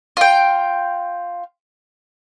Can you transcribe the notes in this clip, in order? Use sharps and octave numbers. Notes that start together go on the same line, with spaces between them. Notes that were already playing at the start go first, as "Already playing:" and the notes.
F4 G5